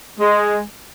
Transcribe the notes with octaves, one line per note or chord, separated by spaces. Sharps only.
G#3